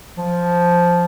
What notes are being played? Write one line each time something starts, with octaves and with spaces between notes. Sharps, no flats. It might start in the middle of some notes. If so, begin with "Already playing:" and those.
F3